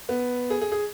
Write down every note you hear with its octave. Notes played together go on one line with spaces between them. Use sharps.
B3
G#4
G#4
G#4